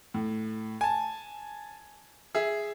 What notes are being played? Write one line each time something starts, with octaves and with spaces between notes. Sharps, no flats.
A2
G#5 A5
G#4 E5